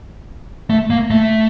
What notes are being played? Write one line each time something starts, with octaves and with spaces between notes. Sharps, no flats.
A3
A#3
A3